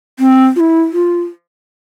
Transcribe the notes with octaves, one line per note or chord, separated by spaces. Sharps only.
C4
F4
E4
F4